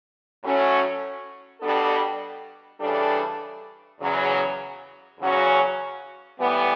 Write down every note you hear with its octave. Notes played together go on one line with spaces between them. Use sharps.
A2 F#3 A3 C#4
B2 G3 B3 D4 A4
C#3 E3 G3 D4 A4
E2 C#3 F#3
E2 C#3 F#3 C#4 F#4
A2 E3 G3 B3